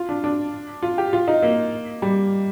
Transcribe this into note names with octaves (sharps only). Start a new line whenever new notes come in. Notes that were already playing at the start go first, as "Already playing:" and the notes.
Already playing: F4
D4
D4
F4
G4
F4
D#4
A#3
G3